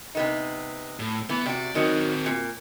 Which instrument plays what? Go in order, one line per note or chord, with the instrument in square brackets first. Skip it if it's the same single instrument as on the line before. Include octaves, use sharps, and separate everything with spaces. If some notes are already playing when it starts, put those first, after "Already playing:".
[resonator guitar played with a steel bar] C3 B3 D#4
[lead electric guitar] A2
[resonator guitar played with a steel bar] E3 [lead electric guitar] B3
[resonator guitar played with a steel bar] C3 F#4 [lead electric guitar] D5
[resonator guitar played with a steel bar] D#3 F#3 [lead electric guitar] C4 F#4
[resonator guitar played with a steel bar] A#2